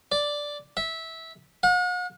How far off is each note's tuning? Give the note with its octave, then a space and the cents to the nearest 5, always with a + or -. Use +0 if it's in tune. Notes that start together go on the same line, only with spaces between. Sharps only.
D5 +0
E5 -15
F#5 -45